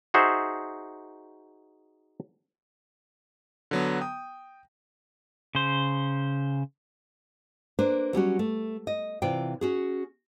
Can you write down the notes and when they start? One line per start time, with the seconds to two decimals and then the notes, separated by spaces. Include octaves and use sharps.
0.14 D#4 F#4 G#4 C5 E5
3.71 D3 F#3 B3
4.01 G5 D#6
5.55 C#3 C5
7.79 A#3 D4 B4 C5
8.13 F#3 G3 C#4 F#4
8.39 A3
8.87 D#5
9.22 C3 E3 F4 D5 G5
9.61 C#4 F#4 G#4